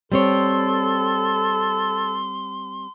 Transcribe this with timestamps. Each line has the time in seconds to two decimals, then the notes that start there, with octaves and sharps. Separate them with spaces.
0.12 G3 C4 A4 C#5 C6